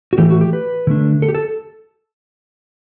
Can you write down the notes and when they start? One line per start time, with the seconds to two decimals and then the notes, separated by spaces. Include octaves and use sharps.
0.13 F#4
0.18 A2 E3 A3 G4
0.30 F#4
0.41 G4
0.53 B4
0.87 D3 A3 D4
1.22 A4
1.28 G4
1.35 A4